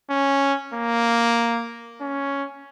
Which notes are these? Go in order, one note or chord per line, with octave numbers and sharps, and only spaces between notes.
C#4
A#3
C#4